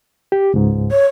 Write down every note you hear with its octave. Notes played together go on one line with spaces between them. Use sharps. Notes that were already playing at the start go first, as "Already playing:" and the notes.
G4
C#2 G#2
C#5